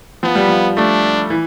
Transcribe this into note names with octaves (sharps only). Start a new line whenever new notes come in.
F3 B3
G3
F3
A3 D4
E3